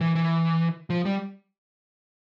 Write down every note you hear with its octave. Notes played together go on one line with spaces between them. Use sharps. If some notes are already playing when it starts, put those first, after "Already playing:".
E3
E3
F3
G3